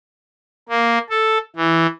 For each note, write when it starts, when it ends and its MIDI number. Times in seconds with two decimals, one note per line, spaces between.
0.69 0.98 58
1.10 1.38 69
1.56 1.86 52